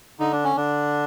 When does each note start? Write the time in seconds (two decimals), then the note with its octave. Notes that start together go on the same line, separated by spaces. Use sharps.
0.20 D3 D#4
0.32 D4
0.44 C#4
0.56 D3 D4